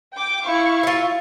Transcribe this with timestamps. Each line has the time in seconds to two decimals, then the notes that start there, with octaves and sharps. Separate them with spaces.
0.13 G5 D6
0.44 E4 F5 C#6
0.83 F4 E5